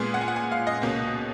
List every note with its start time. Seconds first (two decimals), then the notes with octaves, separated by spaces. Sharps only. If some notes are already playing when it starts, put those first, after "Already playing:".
Already playing: A#2 G#3 B3 G#4
0.14 F#5
0.21 G#5
0.28 F#5
0.36 G#5
0.52 F5
0.67 D#5
0.82 C#2 B2 A#3 C#4